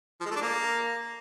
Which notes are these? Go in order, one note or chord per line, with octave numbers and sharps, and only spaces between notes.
F3
G#3
A3
D4
A#3